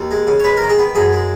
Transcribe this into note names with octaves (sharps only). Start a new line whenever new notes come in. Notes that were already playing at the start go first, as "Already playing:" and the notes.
Already playing: D#2
G#3
C#3
C#5
G#3 B4
D#3 A#4
G#4
B3
F#2 G#4
G#3